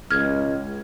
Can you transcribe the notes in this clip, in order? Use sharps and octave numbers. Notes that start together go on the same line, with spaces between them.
C#2 F6 G#6